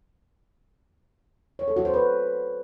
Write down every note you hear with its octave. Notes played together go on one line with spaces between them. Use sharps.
C#5
A4
F#4
C5
B4